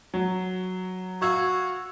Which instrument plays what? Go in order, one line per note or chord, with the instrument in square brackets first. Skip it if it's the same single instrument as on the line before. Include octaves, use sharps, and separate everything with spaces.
[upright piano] F#3
[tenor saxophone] F#4 [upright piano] F5 E6 G#6